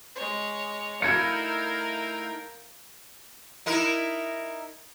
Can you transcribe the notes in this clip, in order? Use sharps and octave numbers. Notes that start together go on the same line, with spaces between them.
G#3 C#5
A3 D#4 E4 A#4 F5 G5 G#6 C#7
D#4 E4 A#4